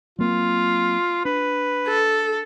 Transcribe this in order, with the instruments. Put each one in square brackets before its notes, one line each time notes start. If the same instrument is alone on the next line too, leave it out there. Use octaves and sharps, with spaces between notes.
[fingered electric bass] F#3 A#3 C4 [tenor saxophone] F4
[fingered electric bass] D4 [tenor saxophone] B4
[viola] A4